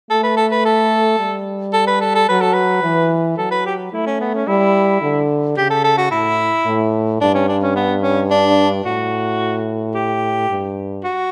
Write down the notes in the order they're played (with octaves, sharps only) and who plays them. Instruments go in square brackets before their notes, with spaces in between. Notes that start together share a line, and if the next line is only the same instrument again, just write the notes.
[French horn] A3 [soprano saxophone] A4
[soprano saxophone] B4
A4
B4
A4
[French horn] G3
[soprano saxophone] A4
B4
A4
A4
[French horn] F#3 [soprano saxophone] B4
[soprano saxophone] A4
B4
[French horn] E3
[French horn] F#3 [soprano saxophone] A4
[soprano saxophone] B4
G4
[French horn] A3 [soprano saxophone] E4
[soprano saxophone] C#4
B3
C#4
[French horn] G3 [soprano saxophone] E4
[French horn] D3
[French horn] C#3 [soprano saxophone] G4
[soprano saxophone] A4
A4
F#4
[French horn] A2 [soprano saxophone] E4
[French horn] A2
[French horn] G2 [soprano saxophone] D4
[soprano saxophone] C#4
D4
C#4
B3
C#4
D4
[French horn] A2 [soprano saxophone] F#4
[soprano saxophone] G4
[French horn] G2
[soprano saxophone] F#4